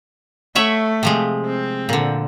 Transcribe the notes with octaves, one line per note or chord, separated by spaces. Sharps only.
A3 C#5 E5 F#5
C3 F3 G#3
C4
A#2 D3